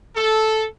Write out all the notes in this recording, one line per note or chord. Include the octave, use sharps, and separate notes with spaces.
A4